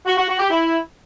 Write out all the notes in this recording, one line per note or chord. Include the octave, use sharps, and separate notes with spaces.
F#4
F#4
F#4
G4
E4